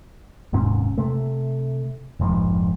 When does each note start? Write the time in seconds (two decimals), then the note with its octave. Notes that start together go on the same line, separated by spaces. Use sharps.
0.53 D#1 G#2 C3 C#4
0.98 C3 A3
2.20 F1 A#1 G#2 F3